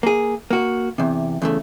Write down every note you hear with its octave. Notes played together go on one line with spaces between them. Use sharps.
A#3 G#4
A#3 F#4
E2 C3
E2 C#3 A3